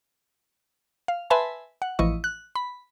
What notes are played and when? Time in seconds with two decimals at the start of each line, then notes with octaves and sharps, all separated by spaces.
1.08 F5
1.30 B4 E5 G#5 A5 B5 C6
1.82 F#5
1.99 A1 E3 F3 E4 D#5 C#6
2.24 F#6
2.56 B5